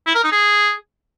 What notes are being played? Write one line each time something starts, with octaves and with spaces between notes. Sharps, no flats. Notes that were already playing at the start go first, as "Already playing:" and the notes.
E4
A#4
D#4
G#4